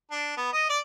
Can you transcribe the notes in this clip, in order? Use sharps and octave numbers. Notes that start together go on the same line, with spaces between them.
D4
B3
D#5
D5